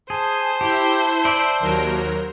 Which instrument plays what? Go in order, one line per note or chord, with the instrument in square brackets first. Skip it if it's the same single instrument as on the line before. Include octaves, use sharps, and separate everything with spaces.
[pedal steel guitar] G#4 [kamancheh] C5 [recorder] A5
[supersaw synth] E4 [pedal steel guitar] G4
[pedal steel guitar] D5 E5
[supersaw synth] D#2 F#3 A#4